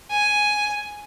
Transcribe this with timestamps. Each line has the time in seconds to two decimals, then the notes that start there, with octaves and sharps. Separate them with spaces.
0.11 G#5